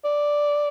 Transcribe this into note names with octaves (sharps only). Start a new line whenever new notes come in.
D5